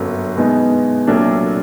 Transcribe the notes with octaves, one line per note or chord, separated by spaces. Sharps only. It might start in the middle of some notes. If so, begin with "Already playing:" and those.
Already playing: G1 F#2 D3 F#3
B2 G#3 B3 D#4
C2 A#2 F#3 A3 D4